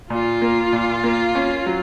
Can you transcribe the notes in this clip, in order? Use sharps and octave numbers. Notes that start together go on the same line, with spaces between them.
A#2 F4
A#3
A#2
A#3
C#4
F#3